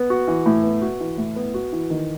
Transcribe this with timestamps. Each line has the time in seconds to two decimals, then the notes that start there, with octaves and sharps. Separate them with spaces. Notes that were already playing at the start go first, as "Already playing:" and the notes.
Already playing: B3
0.10 F#4
0.28 E3
0.46 A2
0.63 B3
0.82 F#4
1.00 E3
1.18 A2
1.36 B3
1.54 F#4
1.73 E3
1.90 D#3